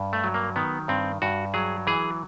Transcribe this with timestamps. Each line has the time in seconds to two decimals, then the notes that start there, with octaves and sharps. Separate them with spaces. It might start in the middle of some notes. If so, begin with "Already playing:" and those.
Already playing: G2
0.13 A3
0.24 F#3
0.34 A#3
0.56 D#3 B3
0.88 G2 C4
1.22 G2 F#4
1.54 F#3 G#4
1.87 E3 G#4